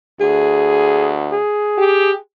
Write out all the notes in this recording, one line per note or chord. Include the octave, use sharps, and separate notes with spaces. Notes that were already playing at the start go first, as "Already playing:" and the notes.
D2 G#4
G#4
G4